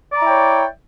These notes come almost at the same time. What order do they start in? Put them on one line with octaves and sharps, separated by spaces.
D5 A#5 E4 G5 C#5